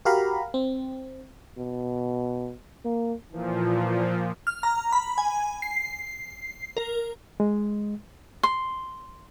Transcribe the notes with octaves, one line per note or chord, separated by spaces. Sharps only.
F#4 G4 A#4 F5 A#5 B5
C4
B2
A#3
A#2 E3 F3
F6
A#5
B5
G#5
C7
A#4
G#3
C6